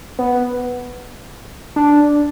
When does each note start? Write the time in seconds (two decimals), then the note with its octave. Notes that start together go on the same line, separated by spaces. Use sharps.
0.19 B3
1.76 D4